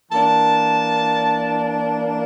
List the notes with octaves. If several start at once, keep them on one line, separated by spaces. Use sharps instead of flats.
E3 A#3 D4 A5
A5